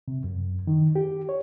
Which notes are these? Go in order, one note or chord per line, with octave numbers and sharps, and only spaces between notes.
C3
F#2
D#3
G4
C#5